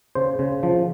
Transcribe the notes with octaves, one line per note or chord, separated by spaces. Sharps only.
C#3 C5
C#3
F3